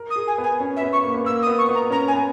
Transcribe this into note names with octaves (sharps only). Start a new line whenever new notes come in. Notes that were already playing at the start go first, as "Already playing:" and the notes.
Already playing: A#4
D#6
G#4
G#5
B3 G#5
C#4
E5
B3
C#6
A#3
B3
A#3 E6
D#6
B3
C#6
B3
A#5
C#4 A#5
G#5
B3